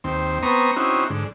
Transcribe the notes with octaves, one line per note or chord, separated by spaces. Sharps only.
D#2 C4
B3 C4 A#5 C#6 D#6
C4 C#4 D#4 E4 F#4
G#2 D3